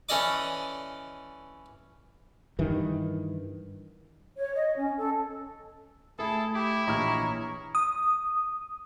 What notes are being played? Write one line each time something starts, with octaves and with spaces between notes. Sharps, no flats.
E3 C#4 A4 D5 D#5 D6
G2 D#3 E3
C#5
D#5
C#4
A4
A3 E4 G#4 A4
E4 G4
A#1 E3 C#5 D#5 A#5 F6
D#6